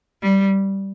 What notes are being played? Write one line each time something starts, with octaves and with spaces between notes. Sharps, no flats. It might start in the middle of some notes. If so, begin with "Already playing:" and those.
G3